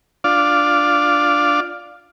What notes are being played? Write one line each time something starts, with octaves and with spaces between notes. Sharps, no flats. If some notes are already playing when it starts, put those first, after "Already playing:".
D4 F4 D5 F5